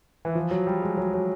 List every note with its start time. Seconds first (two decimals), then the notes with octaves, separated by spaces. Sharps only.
0.25 E3
0.35 F3
0.51 F#3
0.67 G3
0.82 G#3
0.97 F#3
1.14 F#3